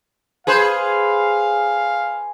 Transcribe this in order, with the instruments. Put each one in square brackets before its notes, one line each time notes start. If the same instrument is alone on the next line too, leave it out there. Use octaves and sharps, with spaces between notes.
[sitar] G#4 B4 C5 [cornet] F5